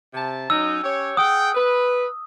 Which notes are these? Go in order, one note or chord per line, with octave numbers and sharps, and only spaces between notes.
C3 A5
F#3 C#4 D#4 E6
C#4 G4 C#5
G#4 F#5 G5 D#6
B4